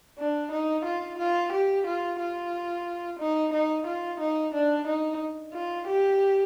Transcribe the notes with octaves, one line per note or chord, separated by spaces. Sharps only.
D4
D#4
F4
F4
G4
F4
F4
D#4
D#4
F4
D#4
D4
D#4
F4
G4